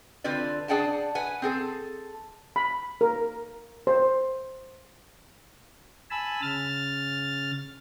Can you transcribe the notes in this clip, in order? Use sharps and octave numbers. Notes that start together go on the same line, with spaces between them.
D3 C4 F4 B4 D5
D4 G#4 D5 F#5 G5 A5
B4 F#5 G#5
C4 G#4 A4
B5
A#4
C5
G#5 A5 B5 E6
C#3 F6 A6